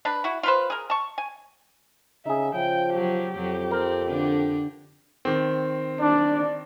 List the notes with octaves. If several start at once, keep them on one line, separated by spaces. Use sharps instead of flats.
D4 B4
E4 F#4
F4 B4 C5
G#4 A#4
A5 C#6
G#5
C#3 D#4 G#4 E5
C#3 F3 G5
F#3 G4
F2 F#3
C4 A#4
D3 D4
D#3 C4
D4 D5